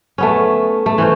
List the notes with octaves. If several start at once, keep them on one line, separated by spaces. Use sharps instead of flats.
A3 B3 C#4
A3
E3 C#4 C5